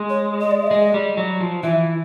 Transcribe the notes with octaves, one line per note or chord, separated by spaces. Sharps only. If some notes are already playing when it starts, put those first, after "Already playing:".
Already playing: G#3
C#5
D#5
D5
E5
G#3 D#5
G3
F#3
F3
E3 E5